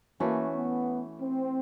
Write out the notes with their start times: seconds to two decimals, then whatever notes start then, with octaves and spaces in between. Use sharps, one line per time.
0.20 E3 A3 A#3 C#4 F#4
0.53 B3
1.19 C4